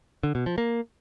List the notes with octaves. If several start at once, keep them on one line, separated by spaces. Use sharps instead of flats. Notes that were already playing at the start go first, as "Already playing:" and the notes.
D3
B2
F3
A#3